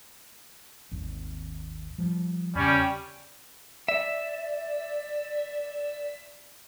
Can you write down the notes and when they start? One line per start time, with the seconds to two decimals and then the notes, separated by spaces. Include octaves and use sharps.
0.91 G#1 D#2
1.98 F3 G3
2.55 E2 C#3 G3 C#4
3.88 D5 E5